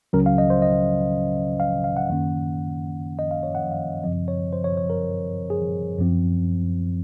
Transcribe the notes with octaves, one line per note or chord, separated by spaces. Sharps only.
C#2 C#3 F#3 C#4 A#4
F5
D#5
C5
D#5
F5
F5
F#5
F#2 D#3 A#3 C#4
D#5
F5
C#5
F#5
F5
F#2 C#3 F3 C4 D#5
C#5
C5
C#5
C#5
A#4
G#4
F#2 F3 C4